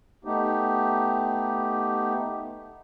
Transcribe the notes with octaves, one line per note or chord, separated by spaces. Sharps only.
A3 B3 D#4 G4